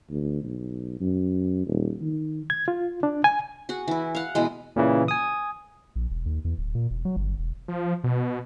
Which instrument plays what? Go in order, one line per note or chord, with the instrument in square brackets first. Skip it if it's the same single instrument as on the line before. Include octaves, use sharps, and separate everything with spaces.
[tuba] D2
B1
F#2
D#1
D#3
[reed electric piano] G#6
F4
D4
G#5
[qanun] F#4 G#4 F#5
E3 E4
F5 F#5
B2 E3 G#3
[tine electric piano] A#2 C#3 E3
G#5 D#6
[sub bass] A#1
E1
D#2
E2
D1
A#2
E1
F#3
G1
E1
[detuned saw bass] F3
B2